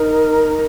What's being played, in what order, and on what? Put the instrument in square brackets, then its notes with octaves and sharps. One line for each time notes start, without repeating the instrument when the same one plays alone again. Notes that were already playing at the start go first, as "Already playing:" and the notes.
Already playing: [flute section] D#4 A#4